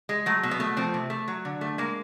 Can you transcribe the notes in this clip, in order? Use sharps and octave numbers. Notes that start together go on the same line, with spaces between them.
G#3
F#3 A3
B2
B3
A3
F3 C4
C3
A3
F#3
D3
A3
G#3 A#3